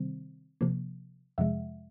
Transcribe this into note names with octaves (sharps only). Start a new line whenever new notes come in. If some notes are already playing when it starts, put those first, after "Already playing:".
Already playing: C3 D#3 G3 C4
C3 F3 A#3
F2 C3 F3 G#3 E5 F#5